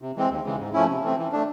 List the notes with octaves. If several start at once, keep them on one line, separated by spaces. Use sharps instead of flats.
C3
E3 G#3 C4
D#2
C#3 E3 G#3
G#2
F3 A3 C#4 E4
C3
E3 A3 C4
E3
A3 D4